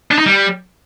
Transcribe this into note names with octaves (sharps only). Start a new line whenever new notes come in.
D4
D#4
G3